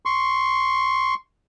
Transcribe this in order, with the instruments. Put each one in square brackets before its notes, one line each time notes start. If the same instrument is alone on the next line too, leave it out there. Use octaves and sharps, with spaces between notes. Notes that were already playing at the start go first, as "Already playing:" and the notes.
[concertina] C6 C#6